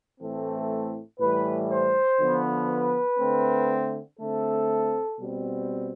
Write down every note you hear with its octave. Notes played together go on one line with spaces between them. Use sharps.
A2 E3 A3 C4 A4
A2 E3 G3 B4
C5
D3 F3 B3
B4
D3 A3 C4
D3 A3 C4 A4
B2 G3 C4